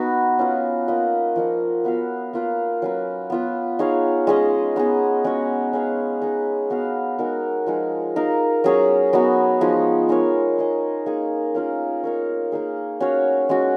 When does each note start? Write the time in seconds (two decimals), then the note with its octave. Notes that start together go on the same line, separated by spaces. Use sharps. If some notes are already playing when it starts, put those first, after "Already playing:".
Already playing: B3 D#4 F#4 B4
0.39 C#4 F4 B4
0.88 A#3 F4 B4 D#5
1.36 F3 A#3 D#4
1.84 B3 F#4 B4 F5
2.33 A#3 F4 B4 F5
2.82 F#3 C#4 F4 B4
3.30 B3 F4 B4
3.79 D#4 G#4 C#5 F5
4.27 G#3 C#4 G#4 D#5
4.76 B3 D#4 G#4
5.24 G#3 C#4 F#4 C#5
5.73 C#4 G#4 B4 F5
6.21 D#4 G#4 B4
6.70 B3 F#4 B4 F5
7.19 G#3 D#4 F#4 A#4
7.66 F3 G#3 D#4 G#4
8.16 D#4 A#4 F5
8.64 F#3 C#4 G#4 C#5
9.13 F#3 B3 D#4 F#4
9.61 F3 G#3 D#4 G#4
10.09 G#3 D#4 A#4 C#5
10.58 D#4 G#4 D#5
11.06 A#3 D#4 G#4
11.55 A#3 C#4 F4 A#4
12.04 D#4 A#4 C#5
12.52 A#3 D#4 G#4
13.00 C#4 F#4 C#5 F5
13.49 G#3 C#4 F#4